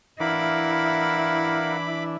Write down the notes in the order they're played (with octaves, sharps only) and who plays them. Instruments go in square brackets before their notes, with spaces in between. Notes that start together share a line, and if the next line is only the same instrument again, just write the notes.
[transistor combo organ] E3 D4 [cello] E4 [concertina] A#4 F5 F#5 [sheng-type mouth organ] B5 D6